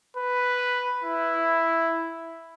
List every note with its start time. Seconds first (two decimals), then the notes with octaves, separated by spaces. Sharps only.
0.17 B4
1.04 E4